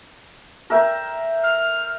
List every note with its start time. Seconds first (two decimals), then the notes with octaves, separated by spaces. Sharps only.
0.70 A#4 E5 G5
1.44 F6